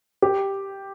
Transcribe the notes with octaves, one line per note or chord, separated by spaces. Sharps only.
G4